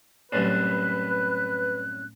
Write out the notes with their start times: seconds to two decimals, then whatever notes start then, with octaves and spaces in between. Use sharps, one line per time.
0.32 C2 F#2 A2 B4 F#6